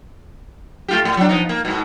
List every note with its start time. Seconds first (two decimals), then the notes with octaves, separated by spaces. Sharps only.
0.88 A3 F4 G4
1.05 A2
1.17 F#3 D4
1.29 F3 B3 D#4
1.49 A#3
1.65 G#2 B2